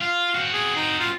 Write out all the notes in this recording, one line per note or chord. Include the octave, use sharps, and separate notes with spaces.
F4 F5
C4 F#4
G#4
D#4
F4